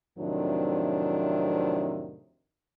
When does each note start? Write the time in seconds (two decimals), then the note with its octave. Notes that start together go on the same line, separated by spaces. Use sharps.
0.18 F2 A2 C3 D#3 F#3 D4